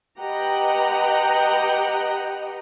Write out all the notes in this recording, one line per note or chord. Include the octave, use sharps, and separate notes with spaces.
G4 B4 D#5 F#5 G5 A#5